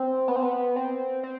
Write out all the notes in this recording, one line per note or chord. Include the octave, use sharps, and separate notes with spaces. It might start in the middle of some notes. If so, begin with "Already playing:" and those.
Already playing: C4
B3
C4
B3
C4
C4